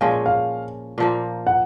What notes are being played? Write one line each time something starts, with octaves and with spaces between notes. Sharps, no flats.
A#2 F3 G#3 C#4 F5
F5
A#2 F3 A#3
F#5